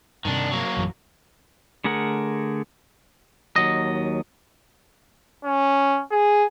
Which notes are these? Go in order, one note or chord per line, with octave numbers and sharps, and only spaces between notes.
G2 C3 D#3 D4
F#3 A#3
A#1 F#2 E3
D3 A3 G#4 A#4 F#5
D#2 F#3 D#5
C#4
G#4